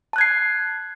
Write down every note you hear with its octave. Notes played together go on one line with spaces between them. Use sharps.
A5 F#6 G#6 C7